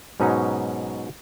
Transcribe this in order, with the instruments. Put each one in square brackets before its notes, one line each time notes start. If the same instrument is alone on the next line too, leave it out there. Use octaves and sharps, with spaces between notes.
[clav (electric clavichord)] G#2 B2 F#3 C#4 D#4